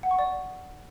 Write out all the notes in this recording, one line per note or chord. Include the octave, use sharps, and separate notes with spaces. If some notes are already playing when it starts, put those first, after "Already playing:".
F#5
C#6
D5